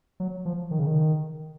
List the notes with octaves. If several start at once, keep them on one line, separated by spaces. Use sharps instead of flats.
F#3
F3
D#3
C#3
D#3